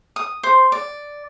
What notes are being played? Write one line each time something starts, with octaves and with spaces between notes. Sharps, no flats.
D#6
C5
D5